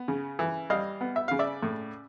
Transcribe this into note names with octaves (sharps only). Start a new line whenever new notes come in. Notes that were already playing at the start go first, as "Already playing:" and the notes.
Already playing: B3
C#3
E3
G3 D#5 F5
B3
E5
C#3 F5
D5 E5
A2